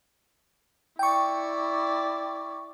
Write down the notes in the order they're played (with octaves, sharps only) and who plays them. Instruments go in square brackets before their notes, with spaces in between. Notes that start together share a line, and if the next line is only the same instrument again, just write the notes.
[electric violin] E4 D5 [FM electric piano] G5 C#6